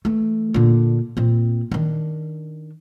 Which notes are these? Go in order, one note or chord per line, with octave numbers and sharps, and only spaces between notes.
E3 A3
A#2 D3
A#2 C4
D#3 D4